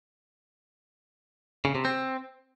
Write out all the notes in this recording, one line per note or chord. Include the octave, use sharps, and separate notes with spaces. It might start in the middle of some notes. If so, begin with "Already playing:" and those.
C#3
C3
C4